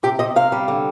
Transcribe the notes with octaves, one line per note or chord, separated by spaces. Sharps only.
C3 G4
C3 D#5
C3 F5
G3
D3